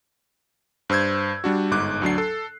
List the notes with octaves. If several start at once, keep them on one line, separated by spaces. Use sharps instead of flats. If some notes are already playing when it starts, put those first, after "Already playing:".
G2 C5 E6 G6 G#6
G3 D4 F#4
G1 G#2 D6 F#6
D2 F#3 D4 C7
A4